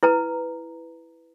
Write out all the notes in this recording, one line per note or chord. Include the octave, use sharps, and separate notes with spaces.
E4 B4 A#5